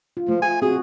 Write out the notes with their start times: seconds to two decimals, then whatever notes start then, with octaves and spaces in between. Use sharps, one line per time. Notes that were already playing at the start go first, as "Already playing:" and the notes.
0.17 F4
0.28 F3 A3
0.42 G#5
0.62 C4 F#4 G#4